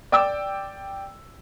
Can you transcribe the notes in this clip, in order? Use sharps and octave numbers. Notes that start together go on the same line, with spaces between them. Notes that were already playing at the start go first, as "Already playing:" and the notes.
D5 G5 D6 E6